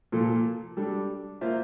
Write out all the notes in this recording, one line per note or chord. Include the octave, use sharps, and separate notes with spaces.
A#2 F3 A#3 F4 A4
G3 D4 A4
A#3 F4 C5 E5